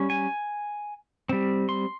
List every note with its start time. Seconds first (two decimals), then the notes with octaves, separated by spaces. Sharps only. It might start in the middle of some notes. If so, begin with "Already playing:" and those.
Already playing: G3 C#4
0.10 G#5
1.29 G3 C4
1.69 C6